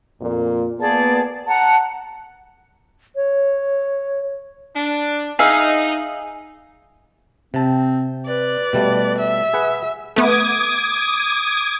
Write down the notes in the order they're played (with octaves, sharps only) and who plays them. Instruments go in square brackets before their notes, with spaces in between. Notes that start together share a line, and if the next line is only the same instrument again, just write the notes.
[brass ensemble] F2 A#2
[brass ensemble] A#3 B3 [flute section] G#4 D5 A5
[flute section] F#5 A#5 [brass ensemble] A5
[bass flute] C#5
[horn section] D4
[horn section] D#4 [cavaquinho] G#4 E5 F5
[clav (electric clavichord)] C3 A5 [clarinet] C4
[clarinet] B4 [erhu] D5
[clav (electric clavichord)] B2 G3 A3
[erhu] E5
[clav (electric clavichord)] G#4 B4 F#5
[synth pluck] A3 B3 [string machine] D6 D#6 G#6